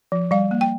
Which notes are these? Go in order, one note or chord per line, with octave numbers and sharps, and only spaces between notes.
F3
G3 F5
A#3
G5